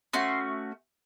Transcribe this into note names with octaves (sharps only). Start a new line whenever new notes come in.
A3 C#4 F#4 C6